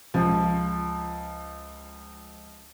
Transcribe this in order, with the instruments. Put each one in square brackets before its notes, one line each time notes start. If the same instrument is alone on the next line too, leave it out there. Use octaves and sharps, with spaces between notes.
[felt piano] C#2 F3